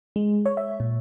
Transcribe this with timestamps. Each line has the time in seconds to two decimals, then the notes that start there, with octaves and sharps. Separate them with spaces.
0.16 G#3
0.46 C#5
0.57 E5
0.80 A#2